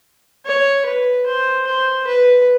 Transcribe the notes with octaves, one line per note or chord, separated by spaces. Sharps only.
C#5
B4
C5
C5
B4